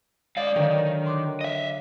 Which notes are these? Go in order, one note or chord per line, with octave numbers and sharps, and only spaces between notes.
G#3 D5 D#5 F5 A6
D3 D#3 F#3 D4
C6 D6 F#6
D#5 E5